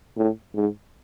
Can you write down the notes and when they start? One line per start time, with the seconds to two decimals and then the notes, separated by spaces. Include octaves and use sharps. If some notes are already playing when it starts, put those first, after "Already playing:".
0.17 A2
0.55 G#2